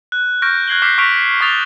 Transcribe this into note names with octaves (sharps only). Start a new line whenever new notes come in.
F#6
C#6 F6 G6 A#6 D7
F#6 G#6 C7 F#7 G7
D6 F6 G6 B6 C7
C#6 F6 A#6 B6 D7 F7
C#6 D#6 A6 F7 G7